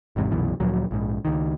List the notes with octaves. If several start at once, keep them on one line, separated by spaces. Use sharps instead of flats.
G#1 E2 G#2 C3
C2 F#2 B2 E3
D2 A#2 F3 F#3
A#1 G#2
C#2 D#3